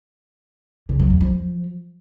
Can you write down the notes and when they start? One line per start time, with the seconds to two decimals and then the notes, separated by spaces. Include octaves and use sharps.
0.89 C#3
1.00 F#3
1.10 E2
1.21 F3